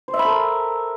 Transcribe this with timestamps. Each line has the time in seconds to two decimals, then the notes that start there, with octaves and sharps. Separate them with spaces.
0.08 C5
0.14 E5
0.19 B5
0.25 A4
0.30 A#4